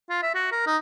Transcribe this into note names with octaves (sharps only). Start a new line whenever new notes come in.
F4
E5
F#4
A#4
D#4